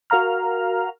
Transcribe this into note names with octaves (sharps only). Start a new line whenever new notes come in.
F#4 A#4 F5 A#5 F6